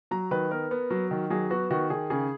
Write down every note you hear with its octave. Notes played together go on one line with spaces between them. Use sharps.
F#3 A#5
D#3 B4
B3 A#4
B3
F#3
D#3
F#3 G#4
B3 F#4
D#3 F#4
D#3 G#4
C#3 G#4